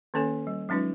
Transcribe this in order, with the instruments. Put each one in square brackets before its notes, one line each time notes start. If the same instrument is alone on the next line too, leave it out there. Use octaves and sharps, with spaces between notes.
[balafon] D#3 A#3 C#4 A4 C#5 G#5
G3
F#3 G#3 C#4 D#4 F4 B4